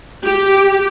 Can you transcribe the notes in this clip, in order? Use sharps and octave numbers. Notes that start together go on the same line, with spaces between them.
G4